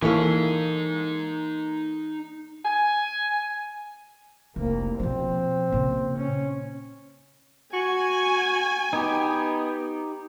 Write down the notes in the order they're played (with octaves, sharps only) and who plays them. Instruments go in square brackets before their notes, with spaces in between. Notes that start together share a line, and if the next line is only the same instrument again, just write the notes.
[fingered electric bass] E3 [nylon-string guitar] A#3 A4 [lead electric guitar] D#4 G#5 [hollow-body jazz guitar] E4 C#5 F5
[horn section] G#5
[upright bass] F1 [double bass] C2 A#3
[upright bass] B2 F3 [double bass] C4
[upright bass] A#2 C#3
[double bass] C#4
[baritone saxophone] F#4 [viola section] G#5
[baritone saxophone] B3 [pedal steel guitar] D#4 G4